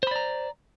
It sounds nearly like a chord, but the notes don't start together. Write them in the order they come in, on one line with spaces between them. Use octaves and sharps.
C5 B5 D5 A#5